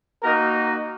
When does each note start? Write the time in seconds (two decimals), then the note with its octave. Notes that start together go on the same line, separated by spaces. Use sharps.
0.23 A#3 D#4 F#4 A#4